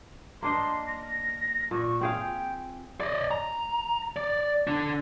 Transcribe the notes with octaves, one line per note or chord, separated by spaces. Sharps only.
A#3 D4 D#5 C6
A#6
A#2 C#6
C4 G#4 F5 G5
D5 D#5
A#5
D5
D3 D4